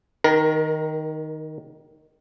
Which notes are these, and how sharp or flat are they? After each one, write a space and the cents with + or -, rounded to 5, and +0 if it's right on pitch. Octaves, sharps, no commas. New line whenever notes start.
D#3 +0 A#4 +35 A#5 +0